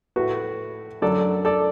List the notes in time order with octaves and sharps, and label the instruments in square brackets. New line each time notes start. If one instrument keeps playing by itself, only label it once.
[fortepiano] A2 A3 F#4 B4
F#2 D3 F#3 A4 D5
A4 D5